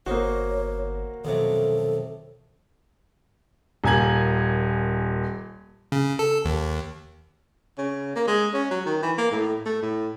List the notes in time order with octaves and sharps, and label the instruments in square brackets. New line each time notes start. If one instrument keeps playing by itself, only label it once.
[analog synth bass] G1 [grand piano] A#3 F#4 [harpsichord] D#4 C5 [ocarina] C#5
[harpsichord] B1 F2 C3 [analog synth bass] D#3 [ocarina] A4
[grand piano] D#1 A#2 G#5 A#5 G#6 F#7
[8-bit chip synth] C#3
A4
D#2
[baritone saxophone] C#3
A#3
G#3
C#4
F#3
D#3
E3
A#3
A2
A3
A2